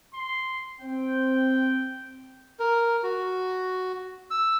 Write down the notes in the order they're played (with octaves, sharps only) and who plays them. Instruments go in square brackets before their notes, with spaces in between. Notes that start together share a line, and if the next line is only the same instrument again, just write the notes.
[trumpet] C6
[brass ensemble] C4 [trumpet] G5
[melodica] A#4
F#4
E6